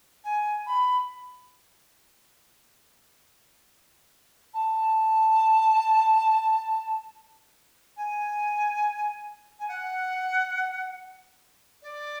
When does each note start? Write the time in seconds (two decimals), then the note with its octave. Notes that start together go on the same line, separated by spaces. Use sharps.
0.23 G#5
0.66 B5
4.53 A5
7.96 G#5
9.59 G#5
9.68 F#5
11.82 D5